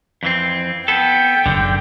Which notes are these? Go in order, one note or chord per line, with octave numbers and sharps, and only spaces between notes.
F2 E3 C4
B3 A4 G5
F#1 D#2 D3